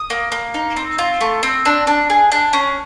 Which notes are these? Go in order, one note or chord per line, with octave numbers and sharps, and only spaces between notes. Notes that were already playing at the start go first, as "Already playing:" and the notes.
Already playing: D#6
A#3
A#3
D#4
C4
F4
A3
C4
D4
D4
G#4
D4
C#4